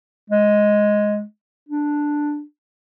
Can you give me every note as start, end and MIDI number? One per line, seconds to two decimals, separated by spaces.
0.30 1.23 56
1.69 2.42 62